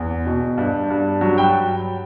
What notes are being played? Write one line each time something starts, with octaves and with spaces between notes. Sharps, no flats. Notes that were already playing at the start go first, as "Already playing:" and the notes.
Already playing: E2
B2
G2
G2
F#3
G5 B5